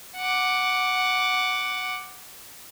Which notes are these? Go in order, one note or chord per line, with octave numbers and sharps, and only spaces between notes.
F#5 D6